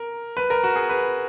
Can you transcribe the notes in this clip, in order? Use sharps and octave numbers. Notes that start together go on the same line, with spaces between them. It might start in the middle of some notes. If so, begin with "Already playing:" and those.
Already playing: A#4
B4
A#4
F#4
G#4
B4